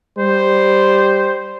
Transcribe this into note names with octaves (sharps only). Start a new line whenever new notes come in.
G3 C5